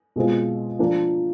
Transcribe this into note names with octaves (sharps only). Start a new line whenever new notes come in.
B2 G#3 C4 F4
F3 A#3 D4